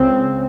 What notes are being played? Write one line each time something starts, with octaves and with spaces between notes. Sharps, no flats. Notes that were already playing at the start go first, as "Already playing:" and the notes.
Already playing: C#2 C#3 C4